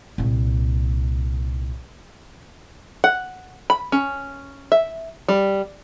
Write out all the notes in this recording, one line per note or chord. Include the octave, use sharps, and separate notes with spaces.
C2 A#2
F#5
B5
C#4
E5
G3